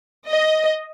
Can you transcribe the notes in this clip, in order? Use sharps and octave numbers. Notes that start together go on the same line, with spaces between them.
D#5